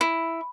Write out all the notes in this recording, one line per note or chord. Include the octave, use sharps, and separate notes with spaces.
E4